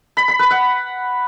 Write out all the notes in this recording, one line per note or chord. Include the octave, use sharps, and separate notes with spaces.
B5
B5
B4
F#5